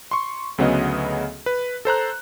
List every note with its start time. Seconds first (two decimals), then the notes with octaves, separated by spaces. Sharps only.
0.11 C6 C#6
0.58 D2 C#3 F#3 B3 G#4 D#5
1.46 B4
1.85 A4 C5 A#5 F#6